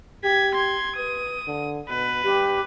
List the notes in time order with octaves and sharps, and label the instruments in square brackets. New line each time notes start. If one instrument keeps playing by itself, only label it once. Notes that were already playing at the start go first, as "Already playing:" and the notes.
[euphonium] G4 [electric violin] G#6 B6
[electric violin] C6 G#6
[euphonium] B4 [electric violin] D#6
[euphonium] D3
[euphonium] B2 [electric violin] B4
[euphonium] G2 [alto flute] G4